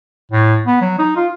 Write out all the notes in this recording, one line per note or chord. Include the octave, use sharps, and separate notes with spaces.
A2
B3
F#3
D#4
F4